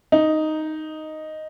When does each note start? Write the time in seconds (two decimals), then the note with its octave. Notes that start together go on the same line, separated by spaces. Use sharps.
0.12 D#4